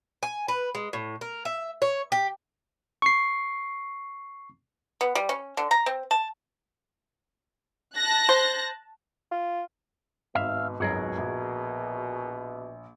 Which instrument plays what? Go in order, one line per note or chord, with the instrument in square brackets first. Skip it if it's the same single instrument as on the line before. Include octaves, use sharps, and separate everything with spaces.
[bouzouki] G#5
B4
G#3
A2
A#4
E5
C#5
G4
[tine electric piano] C#6 C7
[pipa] B3
G3
C#4
D3
A#5
C4
A5
[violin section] A5 F#6 A#6
[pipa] C5
[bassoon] F4
[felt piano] G#1 [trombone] B2 [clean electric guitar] E5 F5
[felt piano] G#1 C#2 F#2 [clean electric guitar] F#4 G#4 A#4
[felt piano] A#1